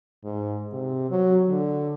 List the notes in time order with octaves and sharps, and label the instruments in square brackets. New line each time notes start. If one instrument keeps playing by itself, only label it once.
[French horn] G#2
C3
F#3
D3